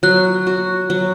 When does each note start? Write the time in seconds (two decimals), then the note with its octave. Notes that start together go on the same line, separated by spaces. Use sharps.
0.03 F#3 F#6
0.47 F#4
0.90 F#3